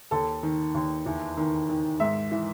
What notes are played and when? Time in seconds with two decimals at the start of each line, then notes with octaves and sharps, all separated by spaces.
0.11 D#2 A4
0.43 D#3
0.74 D#2
1.06 E2
1.37 D#3
1.69 D#3
2.00 G#2 E5
2.31 E3